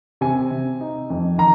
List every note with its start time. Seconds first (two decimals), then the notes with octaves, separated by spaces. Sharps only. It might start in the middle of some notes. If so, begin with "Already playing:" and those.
0.21 C3 G#5
0.51 C3
0.81 D#4
1.10 F2
1.38 D#3 A#5